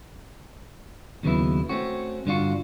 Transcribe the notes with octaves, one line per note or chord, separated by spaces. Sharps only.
D#2 C#3 F#3 B3 E4
A3 C4 C#4 F#4
G2 D3 D4 F4 F#4